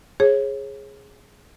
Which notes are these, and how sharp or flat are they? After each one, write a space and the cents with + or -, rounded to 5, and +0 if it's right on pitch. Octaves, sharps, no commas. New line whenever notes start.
G#4 +0 C#5 -30